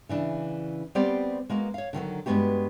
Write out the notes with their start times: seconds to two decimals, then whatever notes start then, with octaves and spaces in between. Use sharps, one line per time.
0.09 C#3 E3 D4
0.95 G3 B3 C4 G4 C5 D5
1.49 G#3 A#3 B3 F#4
1.74 C#5 F5
1.93 D3 D#3 F3 F#3
2.26 G2 E3 G#3 B3 F#4 G4